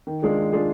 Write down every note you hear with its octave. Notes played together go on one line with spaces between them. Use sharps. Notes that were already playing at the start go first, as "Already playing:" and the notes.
D#3
G#3 D4 F4 G#4
D#3
G#3 D4 F4 G#4